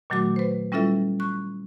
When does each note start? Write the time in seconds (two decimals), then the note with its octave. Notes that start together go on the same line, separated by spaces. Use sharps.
0.10 A#2 D#3 F#3 A3 F#4 D6
0.36 B4 C5
0.72 G3 C#4 E4 F4 A4 E5
1.20 C#6 F#6